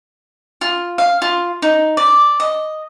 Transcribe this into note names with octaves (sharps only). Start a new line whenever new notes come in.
F4
F5
F4
D#4
D5
D#5